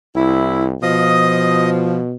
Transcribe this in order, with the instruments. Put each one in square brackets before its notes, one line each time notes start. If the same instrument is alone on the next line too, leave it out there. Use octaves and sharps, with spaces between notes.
[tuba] C2 [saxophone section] E4
[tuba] B2 [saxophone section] F3 [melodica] D#5 D#6